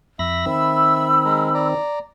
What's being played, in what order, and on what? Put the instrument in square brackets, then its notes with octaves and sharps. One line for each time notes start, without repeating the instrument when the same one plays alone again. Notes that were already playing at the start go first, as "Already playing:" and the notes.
[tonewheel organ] F2 B5 A#6 [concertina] E5
[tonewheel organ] D#3 C4 [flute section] B5 E6
[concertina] G#3 A#4
D5 A#5